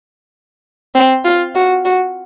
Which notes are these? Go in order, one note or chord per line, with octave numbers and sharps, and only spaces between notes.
C4
F4
F#4
F#4